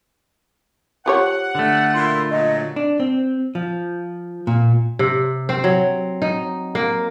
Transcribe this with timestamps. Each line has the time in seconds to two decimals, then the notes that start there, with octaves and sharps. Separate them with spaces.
1.06 F3 G4 C#5 F#5
1.55 D3 A3
1.94 A#2 E4 C6
2.31 A#2 F#3 D#5
2.76 D4
3.00 C4
3.55 F3
4.47 A#2
4.99 C3
5.49 C4
5.64 F#3
6.22 D#4
6.75 A#3